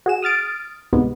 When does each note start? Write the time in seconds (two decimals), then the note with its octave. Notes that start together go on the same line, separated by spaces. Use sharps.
0.06 F#4 G#4 E7
0.23 D#6 F6 A6 D7
0.93 D2 G#2 C3 G#3 B3